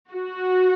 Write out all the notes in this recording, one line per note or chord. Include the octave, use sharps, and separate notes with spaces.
F#4